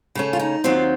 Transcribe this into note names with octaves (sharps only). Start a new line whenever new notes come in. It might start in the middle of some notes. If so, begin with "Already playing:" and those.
C#3 A3 C#4
F4
D#4
D#2 D#3 F#3 C4 F4